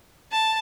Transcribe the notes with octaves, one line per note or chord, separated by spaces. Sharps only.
A5